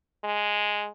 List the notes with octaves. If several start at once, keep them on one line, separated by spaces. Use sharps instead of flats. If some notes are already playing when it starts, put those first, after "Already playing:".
G#3